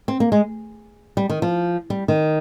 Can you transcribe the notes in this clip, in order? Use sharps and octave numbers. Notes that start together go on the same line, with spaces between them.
C4
A#3
G#3
G3
D#3
F3
G3
D#3